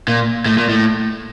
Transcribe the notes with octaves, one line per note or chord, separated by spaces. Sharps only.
A#2
A2
A#2
A2